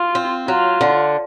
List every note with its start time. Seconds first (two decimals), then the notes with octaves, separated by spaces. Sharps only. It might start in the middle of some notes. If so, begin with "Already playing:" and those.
Already playing: F4
0.15 C4
0.48 F#3 F4
0.81 D3